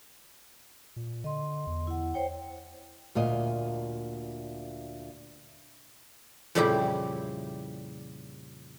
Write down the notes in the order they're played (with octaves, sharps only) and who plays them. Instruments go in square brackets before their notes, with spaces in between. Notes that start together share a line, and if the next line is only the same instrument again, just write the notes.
[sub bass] A#2
[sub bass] D3 [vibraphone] D#5 C6
[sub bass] E2
[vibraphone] E4 F#5
C5 C#5 G5
[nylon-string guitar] D2 A#2 A#4 D#5
[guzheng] F2 A#2 C#3 G3 E4 G4